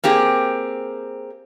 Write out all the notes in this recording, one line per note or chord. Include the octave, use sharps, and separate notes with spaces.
A#3 C4 G4 G#4